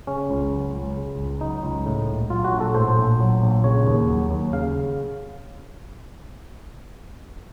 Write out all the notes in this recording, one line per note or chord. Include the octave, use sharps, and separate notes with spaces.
C#3 C#4
C#2
F#3
C#2
C#3
C#2
F#3 D#4
C#2
A2
A#1
F#3 F4
F#4
A#1
A4
A2 C5
A#1
F#3
A#1
C#3 C#5
D#2
F#3
D#2
C#3 F5